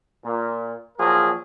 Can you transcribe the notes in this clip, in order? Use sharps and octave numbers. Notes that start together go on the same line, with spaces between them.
A#2
A#2 F3 F#3 G#4 A#4